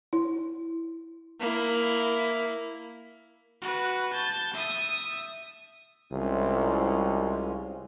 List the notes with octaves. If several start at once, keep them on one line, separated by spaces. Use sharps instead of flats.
E4
A#3 E4
F#4 B4
A5 G6
E5 D#6
C2 G#3 C#4 F4